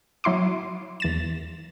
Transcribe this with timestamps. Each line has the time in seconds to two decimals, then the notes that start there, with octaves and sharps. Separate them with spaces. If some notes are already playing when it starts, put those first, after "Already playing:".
0.24 F#3 E4 C6 D6
1.00 E2 A6 E7